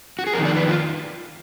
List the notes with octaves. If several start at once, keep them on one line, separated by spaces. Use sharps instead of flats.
F#4
G#4
F2 D#3 A#4
D5
B4
F4